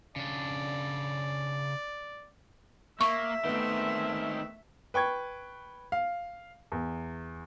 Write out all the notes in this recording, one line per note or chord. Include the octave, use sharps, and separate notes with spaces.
C#3 D4 D5
A#3 E5 C#6
D#3 A3 B3 C4
B4 G5 C#6 G#6
F5
E2